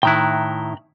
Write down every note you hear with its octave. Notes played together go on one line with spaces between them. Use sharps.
A2 D#3 E4 G5 A#5 F#6